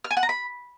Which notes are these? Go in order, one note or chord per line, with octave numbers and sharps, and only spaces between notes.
F6
G#5
F#5
A#5
B5